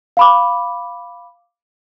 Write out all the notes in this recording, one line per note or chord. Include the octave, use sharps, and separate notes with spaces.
F5 B5 D6